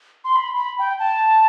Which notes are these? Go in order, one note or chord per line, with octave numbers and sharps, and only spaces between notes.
C6
B5
B5
G5
A5